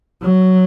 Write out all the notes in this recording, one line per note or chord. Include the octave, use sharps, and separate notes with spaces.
F#3